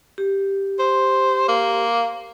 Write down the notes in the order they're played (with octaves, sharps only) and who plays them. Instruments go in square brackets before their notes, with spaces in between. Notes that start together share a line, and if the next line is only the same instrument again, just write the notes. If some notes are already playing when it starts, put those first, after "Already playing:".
[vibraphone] G4
[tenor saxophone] C5
A#3